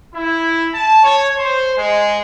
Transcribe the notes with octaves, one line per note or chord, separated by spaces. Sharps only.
E4
A5
C#5
C5
G#3